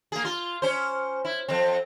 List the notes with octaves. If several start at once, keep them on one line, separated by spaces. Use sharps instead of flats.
A#3 G#4
F4
C#4 C5
E4
F2 C4